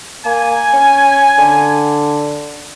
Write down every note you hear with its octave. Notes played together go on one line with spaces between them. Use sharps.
A#3 G#5
C#4
D3